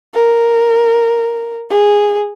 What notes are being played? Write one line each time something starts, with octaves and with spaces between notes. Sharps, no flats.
A#4
G#4